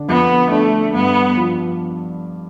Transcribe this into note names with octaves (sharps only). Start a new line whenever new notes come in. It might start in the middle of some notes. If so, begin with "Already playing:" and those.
Already playing: D3 D4
F2 B3
A3 D4
G2 B3
F3